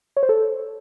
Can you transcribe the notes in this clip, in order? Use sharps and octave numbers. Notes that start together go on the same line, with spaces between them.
C#5
C5
A4